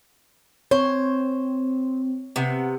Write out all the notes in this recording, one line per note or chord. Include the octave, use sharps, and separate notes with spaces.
C4 C5 C#5
C3 B3 F#5